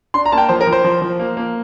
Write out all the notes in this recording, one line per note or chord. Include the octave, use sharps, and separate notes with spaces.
D4 C6
A#5
A#3 A5
G5
F3 C5
A#4
F3
C5
F3
F3
A#3
A#3